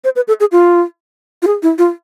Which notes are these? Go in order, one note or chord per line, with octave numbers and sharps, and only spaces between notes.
C5
B4
A4
G#4
F4
F4
G#4
E4
F4